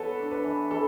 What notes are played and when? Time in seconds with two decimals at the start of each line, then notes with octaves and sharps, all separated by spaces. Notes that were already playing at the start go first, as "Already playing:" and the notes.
Already playing: E3 B3 A4 B4 C#5
0.19 D4
0.32 B4
0.44 E3
0.71 E3 A4